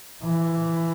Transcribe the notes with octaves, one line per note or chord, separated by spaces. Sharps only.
E3